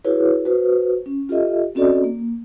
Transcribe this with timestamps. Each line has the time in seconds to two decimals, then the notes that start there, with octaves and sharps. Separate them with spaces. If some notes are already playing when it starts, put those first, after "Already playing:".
0.04 E4 F#4 G#4 B4 C#5
0.45 F#4 B4 C5
1.06 C#4
1.29 F4 G4 A4 D#5 E5
1.75 C4 C#4 F#4 A4 D5 D#5
2.04 A#3